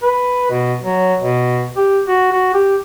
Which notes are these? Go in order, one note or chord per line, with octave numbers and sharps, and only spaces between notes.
B4
B2
F#3
B2
G4
F#4
F#4
G4